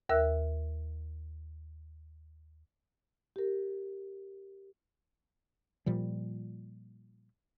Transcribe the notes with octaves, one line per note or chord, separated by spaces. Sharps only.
D#2 A#4 E5 E6 F#6
G4 A#4
A#2 F3 G3